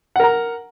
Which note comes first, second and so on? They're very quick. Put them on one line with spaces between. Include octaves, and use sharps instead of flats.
F#5 A#4 A#5